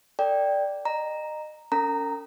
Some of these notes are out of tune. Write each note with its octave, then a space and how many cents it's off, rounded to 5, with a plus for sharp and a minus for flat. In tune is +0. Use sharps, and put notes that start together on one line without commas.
A4 +45 D5 +0 G5 +0
D#5 -30 A#5 +0
C#4 +25 A#4 -45 A#5 -10